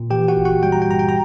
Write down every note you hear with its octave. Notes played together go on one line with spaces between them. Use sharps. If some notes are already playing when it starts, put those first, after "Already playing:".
Already playing: A#2
E3 G4 G5
F#4 F#5
G1
F#4 F#5
G3 G5
A#5
G5
G2 A#5
G5
A#5